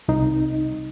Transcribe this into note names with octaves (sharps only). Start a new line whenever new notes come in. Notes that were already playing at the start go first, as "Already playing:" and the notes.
C2 D#4